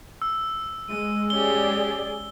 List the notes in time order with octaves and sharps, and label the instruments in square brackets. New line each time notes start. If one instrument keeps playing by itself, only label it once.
[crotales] E6
[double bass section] G#3 [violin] D#7
[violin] C#4 G4 [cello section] G#4 D5 [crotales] G7